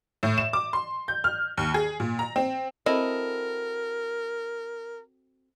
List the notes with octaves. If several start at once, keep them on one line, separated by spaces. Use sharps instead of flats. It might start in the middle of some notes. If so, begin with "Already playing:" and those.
A2
E7
D6
C6
G6
F6
D#2
G#4
A#2
A#5
C4
C4 E4 F#4 A4 A#4 D#5